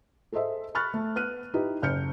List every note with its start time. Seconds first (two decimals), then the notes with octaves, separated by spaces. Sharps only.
0.32 G#4 A4 C5 D#5 E5
0.75 B5 C#6 F6 F#6 A6
0.94 A3
1.16 B3 F6 F#6 D#7
1.54 D#4 E4 G4 B4
1.82 F#1 F6 G6 C#7